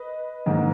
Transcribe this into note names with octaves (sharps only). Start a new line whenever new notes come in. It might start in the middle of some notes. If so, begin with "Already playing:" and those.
Already playing: B4 D#5
G#2 D#3 A#3